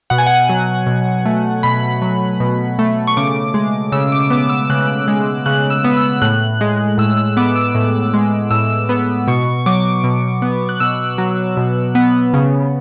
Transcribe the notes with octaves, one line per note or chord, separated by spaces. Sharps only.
B2 F#5
G#5
F#5
F#3
B2
A3
B2 B5
F#3
B2
A3
C#6
C#3 D6
G#3
C#3 E6
D6
B3 D6
E6
C#3 F#6
G#3
C#3 F#6
E6
B3
E6
A2 F#6
G#3
A2 E6
E6
B3 D6
E6
A2
G#3
A2 E6
B3
B2 C#6
F#3 D6
B2
B3
F#6
B2 E6
F#3
B2
B3
C#3